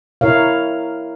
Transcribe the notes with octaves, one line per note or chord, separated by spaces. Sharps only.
E4 A#4 C#5 F5